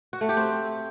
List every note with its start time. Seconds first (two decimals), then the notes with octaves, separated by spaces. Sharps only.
0.13 F#4
0.21 A3
0.29 G4
0.37 C4